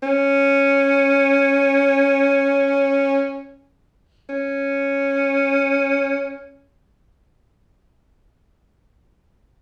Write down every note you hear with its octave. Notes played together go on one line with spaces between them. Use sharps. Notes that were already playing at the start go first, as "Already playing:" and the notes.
C#4
C#4